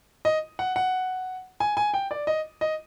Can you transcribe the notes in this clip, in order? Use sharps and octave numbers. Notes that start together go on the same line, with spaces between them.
D#5
F#5
F#5
G#5
G#5
G5
D5
D#5
D#5